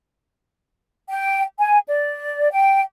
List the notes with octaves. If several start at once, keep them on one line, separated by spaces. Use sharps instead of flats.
G5
G#5
D5
G5